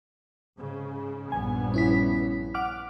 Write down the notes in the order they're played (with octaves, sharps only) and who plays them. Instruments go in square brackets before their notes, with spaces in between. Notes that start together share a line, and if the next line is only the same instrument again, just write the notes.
[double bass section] G#2 C#3
[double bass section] A#1 G2 B3 [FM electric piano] G#5
[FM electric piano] C#4 E4 B6
F#5 D6 F6